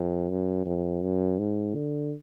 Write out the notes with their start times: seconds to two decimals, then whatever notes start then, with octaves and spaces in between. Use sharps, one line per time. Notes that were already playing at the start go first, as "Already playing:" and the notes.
Already playing: F2
0.29 F#2
0.66 F2
1.02 F#2
1.38 G#2
1.75 D3